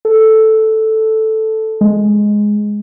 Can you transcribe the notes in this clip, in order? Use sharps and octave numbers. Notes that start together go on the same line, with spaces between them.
A4
G#3